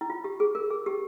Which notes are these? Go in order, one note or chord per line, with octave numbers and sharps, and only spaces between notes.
E4
F4
G4
G#4
A#4
G#4
G4